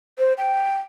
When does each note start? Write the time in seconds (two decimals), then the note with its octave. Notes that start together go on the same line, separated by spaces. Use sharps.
0.18 C5
0.37 G5